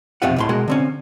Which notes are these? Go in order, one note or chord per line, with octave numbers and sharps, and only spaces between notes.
B1 F2 C3 C4 F4 F#5
C#2 A2 C6
B2 G#3 F#4 A#4
D3 C4 C#4